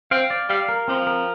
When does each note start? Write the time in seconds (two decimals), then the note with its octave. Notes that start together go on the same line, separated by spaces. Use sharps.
0.11 C4 F5
0.30 D5
0.49 G3 F5
0.69 A#4
0.88 F3 C4
1.07 A#4